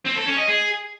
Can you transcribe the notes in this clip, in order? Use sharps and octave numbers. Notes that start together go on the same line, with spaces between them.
C4
A4
C#4
D#5
G#4